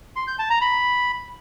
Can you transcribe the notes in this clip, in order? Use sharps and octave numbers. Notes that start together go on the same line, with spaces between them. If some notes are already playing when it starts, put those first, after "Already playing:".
C6
G6
A5
A#5
B5